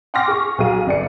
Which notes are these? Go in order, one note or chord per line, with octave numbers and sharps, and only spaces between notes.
F#5 G5 C6 D6 F6 A#6
G#4 C#6
B1 F#3 G#4 F5 D#7
G1 D5 C#7